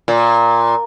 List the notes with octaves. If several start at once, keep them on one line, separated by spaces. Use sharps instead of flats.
A#2